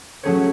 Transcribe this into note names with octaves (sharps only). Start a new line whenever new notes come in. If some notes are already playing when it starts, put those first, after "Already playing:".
F#3 A3 C#4 G#4 C#5